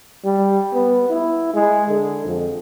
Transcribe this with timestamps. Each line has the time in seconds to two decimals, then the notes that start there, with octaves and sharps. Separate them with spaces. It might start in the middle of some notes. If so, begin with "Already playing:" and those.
0.24 G3
0.74 B3
1.09 E4
1.54 G#3
1.89 D3
2.26 F2